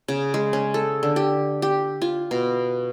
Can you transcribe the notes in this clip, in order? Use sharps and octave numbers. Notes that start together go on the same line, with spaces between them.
C#3
G#3
C#4
A4
D3
G4
G4
F4
B2